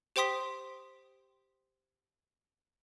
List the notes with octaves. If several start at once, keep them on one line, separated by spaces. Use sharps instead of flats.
G4 C5 G5 C6 D#6 B6